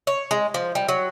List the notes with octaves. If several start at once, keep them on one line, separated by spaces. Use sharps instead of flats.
C#5
G#3
F3
G3
F#3